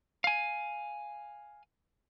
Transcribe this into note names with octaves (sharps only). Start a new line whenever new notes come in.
F5 G#5